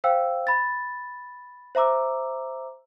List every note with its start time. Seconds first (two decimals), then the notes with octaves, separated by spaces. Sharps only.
0.04 C5 F5 G5 E6
0.47 B5 A6
1.75 C5 E5 A#5 D6 E6